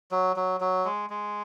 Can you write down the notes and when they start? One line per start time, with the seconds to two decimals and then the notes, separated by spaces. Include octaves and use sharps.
0.11 F#3
0.36 F#3
0.61 F#3
0.85 G#3
1.10 G#3